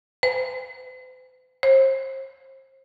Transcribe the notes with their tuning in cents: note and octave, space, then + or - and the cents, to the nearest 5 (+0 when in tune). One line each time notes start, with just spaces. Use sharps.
C5 -45
C5 +35